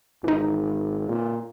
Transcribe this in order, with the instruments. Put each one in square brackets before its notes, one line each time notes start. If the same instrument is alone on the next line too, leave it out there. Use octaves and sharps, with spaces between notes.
[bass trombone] G#1 [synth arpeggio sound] E3 D#4
[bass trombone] A#2